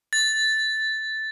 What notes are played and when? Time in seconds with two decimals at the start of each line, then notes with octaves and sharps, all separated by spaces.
0.13 A6